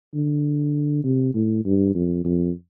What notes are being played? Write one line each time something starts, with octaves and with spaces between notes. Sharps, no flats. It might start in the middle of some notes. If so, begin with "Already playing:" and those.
D3
C3
A2
G2
F2
F2